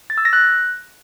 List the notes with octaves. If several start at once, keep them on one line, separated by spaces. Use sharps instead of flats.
A6
E6
A#6
F#6